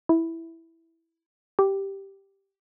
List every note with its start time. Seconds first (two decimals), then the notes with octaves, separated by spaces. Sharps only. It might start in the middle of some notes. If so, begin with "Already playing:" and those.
0.09 E4
1.59 G4